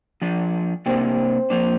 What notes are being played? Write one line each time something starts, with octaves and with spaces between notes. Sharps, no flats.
F3 D4
C3 A#3 C4 D4
F3 A#3 D4